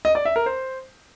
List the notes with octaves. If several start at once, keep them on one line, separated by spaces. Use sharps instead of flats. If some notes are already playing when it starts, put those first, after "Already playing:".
D#5
D5
E5
A#4
C5